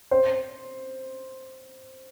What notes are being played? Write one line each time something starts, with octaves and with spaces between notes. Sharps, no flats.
C5